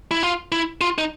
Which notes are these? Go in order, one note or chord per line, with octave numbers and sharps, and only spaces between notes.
E4
F4
E4
F4
D#4